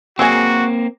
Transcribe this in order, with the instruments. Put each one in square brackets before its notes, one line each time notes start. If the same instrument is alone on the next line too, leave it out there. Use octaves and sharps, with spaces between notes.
[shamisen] F#3 G#3 G#4 [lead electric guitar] A#3 C4 [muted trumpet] F#4